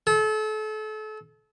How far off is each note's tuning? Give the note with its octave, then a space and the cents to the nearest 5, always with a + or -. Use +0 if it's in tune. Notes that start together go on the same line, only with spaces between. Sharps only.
A4 -35